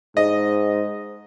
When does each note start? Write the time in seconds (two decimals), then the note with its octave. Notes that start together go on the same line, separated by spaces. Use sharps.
0.17 G#2 D#5